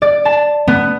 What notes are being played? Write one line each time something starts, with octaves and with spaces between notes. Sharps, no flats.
D5
A5
B3